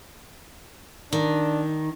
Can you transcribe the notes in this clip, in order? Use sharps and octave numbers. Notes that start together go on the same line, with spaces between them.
D#3 D4